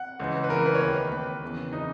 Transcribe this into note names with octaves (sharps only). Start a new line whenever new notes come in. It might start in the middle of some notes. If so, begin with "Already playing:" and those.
Already playing: F#5
C#2 C#3 E3
B4
C#2 C#3 E3 A#4
B4
C#5
D#2 D#3 B4
D#2 D#3 B4
E2 C#3 E3
C#3 E3 D#4